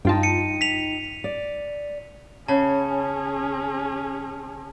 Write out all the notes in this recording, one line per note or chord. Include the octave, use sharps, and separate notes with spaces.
G2 D#4 F4 G5 A5
C#7 D#7
B6 F7
D5
C#3 C#4 G#4 A5